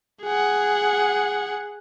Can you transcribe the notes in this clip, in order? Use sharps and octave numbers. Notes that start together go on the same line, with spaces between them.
G#4 F#5